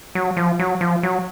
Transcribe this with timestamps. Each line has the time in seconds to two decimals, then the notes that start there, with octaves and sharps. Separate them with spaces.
0.15 F#3
0.37 F3
0.59 F#3
0.81 F3
1.03 F#3